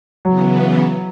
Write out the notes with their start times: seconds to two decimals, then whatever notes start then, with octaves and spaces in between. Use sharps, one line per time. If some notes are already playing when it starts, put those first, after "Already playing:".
0.25 C#3 E3 F#3 B3